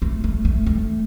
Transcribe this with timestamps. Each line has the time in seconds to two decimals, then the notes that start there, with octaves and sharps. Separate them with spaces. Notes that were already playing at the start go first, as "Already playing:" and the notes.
0.02 A3
0.24 A3
0.45 A3
0.66 A3